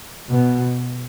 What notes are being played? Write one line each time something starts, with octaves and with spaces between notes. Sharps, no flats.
B2